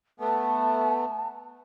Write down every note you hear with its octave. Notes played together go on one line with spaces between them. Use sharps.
A3 B3 A5